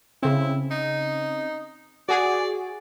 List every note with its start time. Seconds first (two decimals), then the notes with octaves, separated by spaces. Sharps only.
0.23 C#3 C4 E4
0.71 D#4
2.09 F#4 G#4 D5